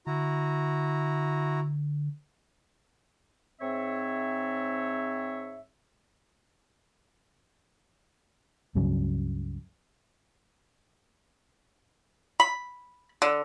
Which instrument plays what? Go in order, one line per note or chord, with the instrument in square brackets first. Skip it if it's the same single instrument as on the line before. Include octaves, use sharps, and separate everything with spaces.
[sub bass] D3 [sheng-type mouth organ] E4 F#4 A#5
[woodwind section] G#2 C4 C#5 E5
[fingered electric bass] C#2 G2 C#3 F#3
[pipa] B5
D3